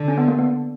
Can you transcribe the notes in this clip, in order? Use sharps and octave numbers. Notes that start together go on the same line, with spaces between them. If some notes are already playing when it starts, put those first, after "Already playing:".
Already playing: D3
C#4
B3
A#3
B3